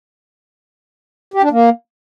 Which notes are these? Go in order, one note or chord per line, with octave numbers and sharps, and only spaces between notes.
G4
D4
A#3